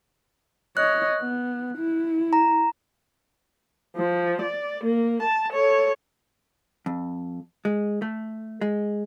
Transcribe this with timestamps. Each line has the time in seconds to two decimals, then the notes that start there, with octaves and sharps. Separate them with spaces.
0.77 C#5 D#5 F#6
1.21 B3
1.77 E4
2.33 A#5
3.97 F3
4.42 D5
4.84 A#3
5.23 A5
5.53 A4 C#5
6.86 F2
7.65 G#3
8.02 A3
8.61 G#3